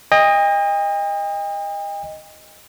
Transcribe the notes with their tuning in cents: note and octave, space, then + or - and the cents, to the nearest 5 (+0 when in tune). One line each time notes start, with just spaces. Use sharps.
D#5 +0 G5 +45